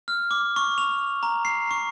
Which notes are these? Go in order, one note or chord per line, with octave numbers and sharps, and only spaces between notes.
F6
D6
C#6
F7
A#5
C7
C#6